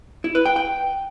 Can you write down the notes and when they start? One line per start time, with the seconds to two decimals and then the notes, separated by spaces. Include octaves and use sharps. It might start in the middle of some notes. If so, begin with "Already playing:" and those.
0.24 E4
0.35 B4
0.45 G5
0.56 G5